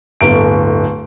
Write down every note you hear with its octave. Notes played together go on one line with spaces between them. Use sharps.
D1 G1 D7